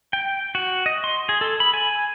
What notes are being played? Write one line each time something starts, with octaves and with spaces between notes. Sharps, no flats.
G5
F#4
D#5
C6
G#4
A4
B5
G#5